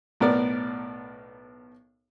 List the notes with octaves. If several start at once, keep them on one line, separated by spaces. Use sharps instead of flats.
B1 A2 B3 A#4 D5